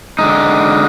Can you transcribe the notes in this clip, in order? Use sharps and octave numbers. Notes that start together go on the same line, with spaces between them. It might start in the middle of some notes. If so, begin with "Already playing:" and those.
D3 G#3 D#4